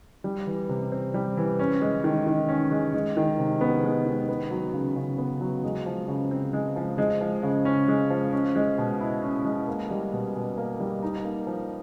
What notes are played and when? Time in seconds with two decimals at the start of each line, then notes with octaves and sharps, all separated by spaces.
0.24 G3
0.46 E3
0.69 C3
0.92 C4
1.14 G3
1.37 E3
1.59 C#4
1.81 G#3
2.04 D#3
2.27 D#3
2.49 C#4
2.71 G#3
2.94 G#3
3.17 D#3
3.38 C3
3.61 B3
3.83 G#3
4.06 D#3
4.28 B3
4.51 F#3
4.74 C#3
4.96 C#3
5.18 B3
5.41 F#3
5.64 G#3
5.86 F3
6.08 C#3
6.31 C4
6.53 G#3
6.76 F3
6.98 G#3
7.21 F3
7.43 C#3
7.65 C#4
7.88 G#3
8.10 F3
8.33 C#4
8.56 G#3
8.78 B2
9.01 E4
9.23 C#4
9.45 G#3
9.68 A#3
9.91 G3
10.13 B2
10.36 B2
10.57 A#3
10.80 G3
11.03 D#4
11.24 A#3
11.47 F3